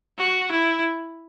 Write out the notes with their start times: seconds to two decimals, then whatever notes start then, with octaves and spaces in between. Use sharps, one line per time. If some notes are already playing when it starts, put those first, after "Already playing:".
0.18 F#4
0.52 E4